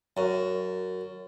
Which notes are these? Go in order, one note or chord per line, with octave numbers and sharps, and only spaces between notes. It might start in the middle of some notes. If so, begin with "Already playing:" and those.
F#2